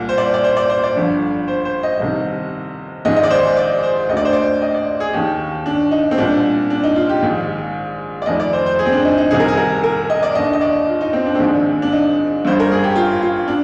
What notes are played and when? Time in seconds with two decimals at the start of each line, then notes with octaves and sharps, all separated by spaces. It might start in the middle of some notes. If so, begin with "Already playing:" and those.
Already playing: C2 A#2
0.09 C5
0.18 D5
0.34 D5
0.44 C5
0.57 D5
0.69 C5
0.83 D5
0.96 G1 F2 D3
1.48 C5
1.65 C5
1.83 D#5
2.00 C2 C3 D#3
3.05 A#1 G#2 D#3 D#5
3.16 D#5
3.23 D5
3.30 C5
3.57 D5
3.83 C5
4.09 D2 D3 D#5
4.17 D5
4.25 C5
4.33 D5
4.62 D#5
4.74 D5
5.00 G#4
5.13 D#2 D#3 G4
5.66 D4
5.91 D#4
6.11 C4
6.18 C2 A#2 D4
6.70 D4
6.84 D#4
6.96 F4
7.09 G4
7.22 A#1 G#2 D#3
8.22 D5
8.26 F1 F2 D#3 D#5
8.40 D5
8.53 C5
8.66 C5
8.79 G#4
8.86 C4
8.92 D4
9.05 D#4
9.18 D#4
9.31 C2 C3 D#3 G#4
9.40 A#4
9.48 G#4
9.57 A#4
9.84 A#4
10.10 D#5
10.23 D5
10.35 D#2 D3 D#5
10.53 D#5
10.61 D5
10.88 F4
11.01 D#4
11.13 C4
11.26 D4
11.35 C4
11.39 A#1 G#2 D#3 D4
11.82 D4
11.92 D#4
12.45 G1 G2 D3 C5
12.60 A#4
12.72 G#4
12.84 G4
12.96 F4
13.22 F4
13.48 D4